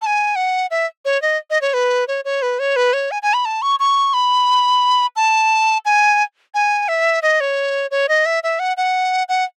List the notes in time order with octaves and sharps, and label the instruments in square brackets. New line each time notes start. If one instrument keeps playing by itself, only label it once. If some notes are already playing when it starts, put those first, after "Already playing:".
[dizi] A5
G#5
F#5
E5
C#5
D#5
D#5
C#5
B4
C#5
C#5
B4
C#5
B4
C#5
G#5
G#5
B5
A5
C#6
C#6
B5
A5
G#5
G#5
E5
D#5
C#5
C#5
D#5
E5
E5
F#5
F#5
F#5